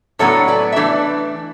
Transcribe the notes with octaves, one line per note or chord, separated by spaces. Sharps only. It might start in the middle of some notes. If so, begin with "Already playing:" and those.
A2 F#3 B3 D4 A4 C#5
B4 D5
E5
E3 A3 D4 B4 D5